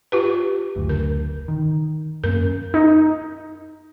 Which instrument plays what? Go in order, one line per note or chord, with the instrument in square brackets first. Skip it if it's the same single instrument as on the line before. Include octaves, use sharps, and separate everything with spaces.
[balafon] F4 G4 B4
[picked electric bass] F#1 D2
[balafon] A#4
[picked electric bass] D#3
[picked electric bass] F#2 A#3 C#4 [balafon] A#4
[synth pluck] D#4